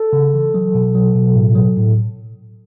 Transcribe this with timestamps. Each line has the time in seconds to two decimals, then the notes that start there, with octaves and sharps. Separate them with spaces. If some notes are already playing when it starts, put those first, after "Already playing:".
Already playing: A4
0.13 C#3
0.34 E3
0.54 F#3
0.75 B2
0.95 F#3
1.15 B2
1.35 A2
1.56 F#3
1.77 A2